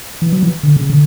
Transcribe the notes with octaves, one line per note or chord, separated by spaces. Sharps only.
E3
F#3
E3
D3
C#3
D3